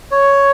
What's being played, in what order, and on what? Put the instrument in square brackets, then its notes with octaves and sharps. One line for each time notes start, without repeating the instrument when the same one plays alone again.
[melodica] C#5